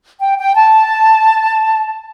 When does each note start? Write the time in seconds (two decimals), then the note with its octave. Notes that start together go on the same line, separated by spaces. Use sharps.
0.20 G5
0.39 G5
0.56 A5